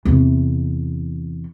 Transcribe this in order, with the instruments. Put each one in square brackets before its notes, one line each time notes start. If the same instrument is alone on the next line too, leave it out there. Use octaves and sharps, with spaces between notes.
[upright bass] E2 C3